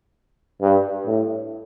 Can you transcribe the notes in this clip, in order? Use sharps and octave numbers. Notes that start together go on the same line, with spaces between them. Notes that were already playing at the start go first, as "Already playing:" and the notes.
G2
A2